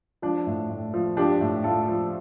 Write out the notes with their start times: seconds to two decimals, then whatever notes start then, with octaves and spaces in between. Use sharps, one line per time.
0.22 F3 D4
0.47 A2
0.70 A2
0.94 F3
1.17 F3 D4 G4
1.41 A2
1.64 A2 F4 A4
1.88 F3